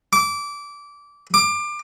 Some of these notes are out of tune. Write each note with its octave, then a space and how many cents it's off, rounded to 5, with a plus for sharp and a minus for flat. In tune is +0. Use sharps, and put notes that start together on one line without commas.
D6 -20
D6 +25